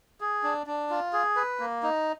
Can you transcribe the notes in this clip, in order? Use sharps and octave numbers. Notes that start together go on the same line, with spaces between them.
G#4
D4
D4
F4
G#4
B4
A#3
D#4